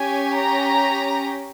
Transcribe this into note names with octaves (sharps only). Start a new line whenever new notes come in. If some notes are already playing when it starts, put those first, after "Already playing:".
Already playing: C#4 G4 G#5
A#5